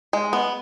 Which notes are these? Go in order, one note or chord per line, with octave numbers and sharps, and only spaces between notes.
G#3
B3